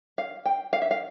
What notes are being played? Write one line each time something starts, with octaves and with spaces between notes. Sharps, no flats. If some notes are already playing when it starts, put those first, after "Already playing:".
F5
G5
F5
E5
F5